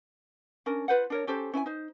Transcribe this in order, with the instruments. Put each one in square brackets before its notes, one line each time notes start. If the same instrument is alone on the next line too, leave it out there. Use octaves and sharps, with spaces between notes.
[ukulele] C#4 D4 A#4
F4 B4 C5 F#5
D4 A#4 C#5
C#4 G4 A4 C5
C#4 E4 C5 G#5
D#4 C5